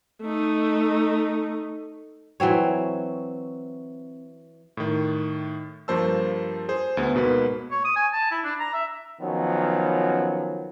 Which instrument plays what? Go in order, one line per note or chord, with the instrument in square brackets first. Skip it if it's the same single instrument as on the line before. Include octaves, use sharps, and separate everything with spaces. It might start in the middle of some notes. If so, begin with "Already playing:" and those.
[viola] A3 D#4
[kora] E3 F#3 C4 C#5
[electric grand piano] A2 D#3
G2 F3 A#3 C5 A5 E6
G#4 C5
D2 B3
G#2 B2 A#3 B4
[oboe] C#5
D#6
G#5
A5
E4
D4
A#5
E5
[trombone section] D#3 F3 F#3 B3 C#4